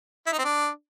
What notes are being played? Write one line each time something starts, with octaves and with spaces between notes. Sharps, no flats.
E4
D#4
C4
D4